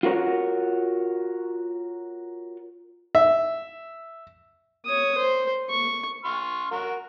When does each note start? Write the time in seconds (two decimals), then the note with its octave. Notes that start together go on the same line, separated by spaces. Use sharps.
0.03 F4 F#4 A#4 C#5
3.15 E5
4.85 C#5 D#6
5.18 C5
5.69 C#6
6.25 C6 C#6 F6
6.71 F#4 A#4